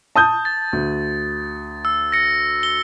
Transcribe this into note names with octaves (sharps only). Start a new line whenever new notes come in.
A5 D#6 G6
A6
D2
E6
A#6 C#7
G7